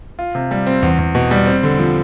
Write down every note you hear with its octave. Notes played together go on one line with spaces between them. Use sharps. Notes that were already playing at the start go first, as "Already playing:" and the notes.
F4
C3
G3
C4
E2
E2
B2
G3
C4
D3
F3